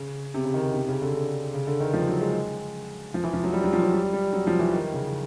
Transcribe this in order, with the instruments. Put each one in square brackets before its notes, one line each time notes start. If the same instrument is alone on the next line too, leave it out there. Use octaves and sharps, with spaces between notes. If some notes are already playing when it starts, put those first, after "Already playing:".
Already playing: [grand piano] C#3
C3
C#3
D#3
C3
C#3
D3
D3
C#3
D3
D#3
F3
F#3
G#3
F3
E3
F3
F#3
G3
F#3
F3
F#3
G3
G3
F#3
F3
E3
D#3
C#3